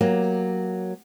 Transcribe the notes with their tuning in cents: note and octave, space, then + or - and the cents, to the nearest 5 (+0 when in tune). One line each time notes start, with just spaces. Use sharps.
F#3 +0 A#3 +5 G4 +0